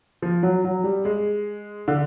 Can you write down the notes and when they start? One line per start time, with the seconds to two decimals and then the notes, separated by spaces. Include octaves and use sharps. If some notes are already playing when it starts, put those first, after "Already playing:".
0.22 F3
0.43 F#3
0.64 F#3
0.84 G3
1.05 G#3
1.88 D3